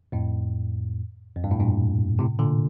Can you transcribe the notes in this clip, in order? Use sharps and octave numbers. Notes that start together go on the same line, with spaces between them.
F2 A2
F2
G2
A2
G2 A#2
A2 C3
A#2 D3